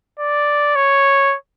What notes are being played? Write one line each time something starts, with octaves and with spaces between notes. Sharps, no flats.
D5
C#5